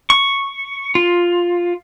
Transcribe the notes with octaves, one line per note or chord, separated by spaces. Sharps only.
C#6
F4